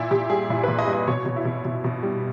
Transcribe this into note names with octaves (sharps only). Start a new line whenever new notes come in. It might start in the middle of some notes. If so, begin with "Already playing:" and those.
Already playing: A#2 E4
A#2 G4
G3 G#4
A#2 E4
A#2 B4
D#5
G3
D#5
B2 C#5
B2
E4
B2
B2
B2
G3